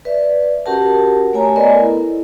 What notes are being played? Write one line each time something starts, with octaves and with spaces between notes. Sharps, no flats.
B4 D5 E5
C#4 F#4 G4 A#4 F#5 A5
A3 G4 C#5 G#5 A#5
B3 A#4 B4 D5 D#5 G#5
E4 A4